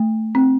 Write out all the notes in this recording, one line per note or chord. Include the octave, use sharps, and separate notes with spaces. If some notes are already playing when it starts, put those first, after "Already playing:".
Already playing: A3
C4